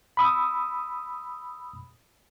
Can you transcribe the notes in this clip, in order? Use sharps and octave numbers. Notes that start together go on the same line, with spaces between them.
B5 D#6 E6